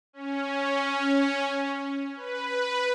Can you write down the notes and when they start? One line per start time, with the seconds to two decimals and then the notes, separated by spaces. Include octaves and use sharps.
0.13 C#4
2.16 B4